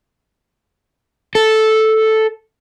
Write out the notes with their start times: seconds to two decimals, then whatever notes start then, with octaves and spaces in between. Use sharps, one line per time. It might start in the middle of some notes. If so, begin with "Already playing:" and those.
1.35 A4